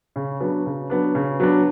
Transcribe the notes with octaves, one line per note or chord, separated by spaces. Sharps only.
C#3
F#3 B3 D4
C#3
F#3 B3 D4
C#3
F#3 B3 D4